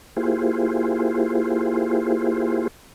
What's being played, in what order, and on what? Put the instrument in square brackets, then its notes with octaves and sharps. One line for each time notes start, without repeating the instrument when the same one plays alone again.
[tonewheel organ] A#3 E4 F4 G4 G#4 C5